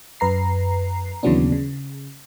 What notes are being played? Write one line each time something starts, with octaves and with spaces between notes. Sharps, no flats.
F#2 B4 A#5 C7
D#2 C#3 E3 F#3 B3 D4
C#3